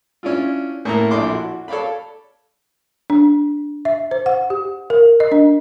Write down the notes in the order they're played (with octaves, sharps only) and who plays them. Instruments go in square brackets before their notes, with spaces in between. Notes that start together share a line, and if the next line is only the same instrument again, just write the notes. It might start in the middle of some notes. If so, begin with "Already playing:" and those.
[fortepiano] C#4 D4 E4 F4
A2 A#3 E4 A#5
A#1 D4 E4 A4 C6 D6
F#4
A4 C#5 D5 F5 B5
[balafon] D4
E5
C5
F#5
G4
A#4
D#5
D4